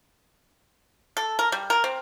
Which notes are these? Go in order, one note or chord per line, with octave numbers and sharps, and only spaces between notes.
A4
A#4
G3
A#4
C4